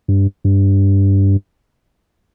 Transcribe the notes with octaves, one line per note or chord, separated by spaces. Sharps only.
G2
G2